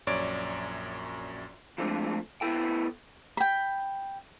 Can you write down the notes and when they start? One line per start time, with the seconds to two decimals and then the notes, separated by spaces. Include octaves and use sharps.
0.07 A#1 F#2 C#5 D5 D7
1.78 F3 G#3 A3 C4 D4
2.41 B3 E4 A4 G5
3.37 G5 B5